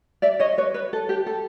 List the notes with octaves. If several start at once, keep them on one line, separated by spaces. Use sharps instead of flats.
D5 E5
C#5 D#5
B4 C#5
B4
A4
G4
A4